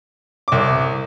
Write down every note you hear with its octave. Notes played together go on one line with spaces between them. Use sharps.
C2 D6